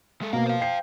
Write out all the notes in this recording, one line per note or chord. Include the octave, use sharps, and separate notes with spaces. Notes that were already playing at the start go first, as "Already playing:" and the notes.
G#3 A4
B2 A#3 A#4 F5
C5 F5
G5 C7